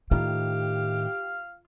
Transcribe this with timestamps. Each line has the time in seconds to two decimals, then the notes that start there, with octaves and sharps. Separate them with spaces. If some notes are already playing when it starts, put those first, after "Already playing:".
0.11 A2 D#3 F4 G4 F5